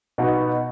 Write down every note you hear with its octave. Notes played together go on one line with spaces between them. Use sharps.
B2 B3 D#4 F#4